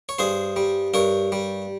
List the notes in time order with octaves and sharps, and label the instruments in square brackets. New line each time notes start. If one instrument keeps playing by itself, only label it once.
[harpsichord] C#5
G2 G#4 C5
G3
G2 A#4 C#5
G3